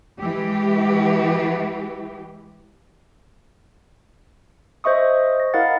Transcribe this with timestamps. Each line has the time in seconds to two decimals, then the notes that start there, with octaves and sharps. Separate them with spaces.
0.20 E3 G#3 G4
4.84 C5 D#5 E5 C#6 D#6
5.40 A#6
5.54 E4 A#4 D#5 F5 F#5 A6